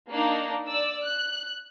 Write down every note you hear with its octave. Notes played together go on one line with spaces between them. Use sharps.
A#3 D4 D#4
D5 E6
F#6